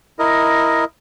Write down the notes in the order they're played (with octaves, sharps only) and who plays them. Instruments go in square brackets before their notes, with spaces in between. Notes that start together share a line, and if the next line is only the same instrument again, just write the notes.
[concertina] E4 A#4 D#5